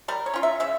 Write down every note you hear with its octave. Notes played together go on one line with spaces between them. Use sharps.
G3 A#4
C#5
C#4 F4
E5
C#3 E5